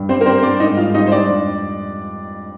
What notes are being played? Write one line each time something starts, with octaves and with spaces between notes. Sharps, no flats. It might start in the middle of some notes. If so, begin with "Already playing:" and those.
Already playing: G2
G3 C4 C5
A#4
G3 C4 C5
G3 D4 D5
G#2 D#4 D#5
G#2 F4 F5
G3 D#4 D#5
C5
G3 D4 D5
F2